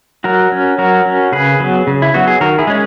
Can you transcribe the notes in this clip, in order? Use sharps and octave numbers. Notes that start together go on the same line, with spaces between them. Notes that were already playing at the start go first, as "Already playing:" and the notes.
F#3 F#4 A#4
C#4
F#3 F#4 A#4
C#4
C#3 G#4 B4
F#3 B3
C#3
E4
F#3 B3 F#4
G#4
D#3 F#4 A#4
E4 G#4
G#3 C#4